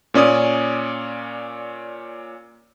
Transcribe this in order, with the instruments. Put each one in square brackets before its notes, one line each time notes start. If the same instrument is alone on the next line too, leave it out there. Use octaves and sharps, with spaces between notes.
[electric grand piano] A#2 C#4 D5 D#6